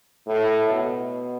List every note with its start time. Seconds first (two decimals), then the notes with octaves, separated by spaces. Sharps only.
0.27 A2
0.70 B2